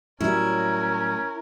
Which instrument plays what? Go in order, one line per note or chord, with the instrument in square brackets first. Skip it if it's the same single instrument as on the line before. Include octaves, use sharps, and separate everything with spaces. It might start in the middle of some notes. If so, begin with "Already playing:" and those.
[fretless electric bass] A2 F#3 G3 [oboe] C#4 [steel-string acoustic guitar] E4 [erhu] A#4